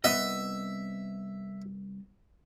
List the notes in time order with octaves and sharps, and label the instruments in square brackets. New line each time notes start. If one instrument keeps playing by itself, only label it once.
[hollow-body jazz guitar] C2 B3 D#5 [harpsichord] E5